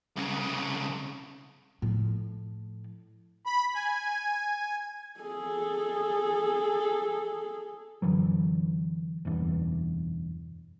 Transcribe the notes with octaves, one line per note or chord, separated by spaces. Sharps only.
C2 C#3
A2 F3
B5
G#5
G#4 A4
F#2 D3 E3 F#3
F#1 B1 E2 G2